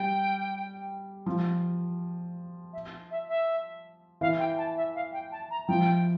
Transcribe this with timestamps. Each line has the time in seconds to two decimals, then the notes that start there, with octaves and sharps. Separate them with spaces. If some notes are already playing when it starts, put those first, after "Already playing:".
Already playing: G3 G5
1.26 F3
2.73 E5
3.11 E5
3.29 E5
4.21 E3 F5
4.39 G5
4.58 A5
4.77 E5
4.95 F5
5.13 G5
5.32 A5
5.51 A#5
5.68 F3 G5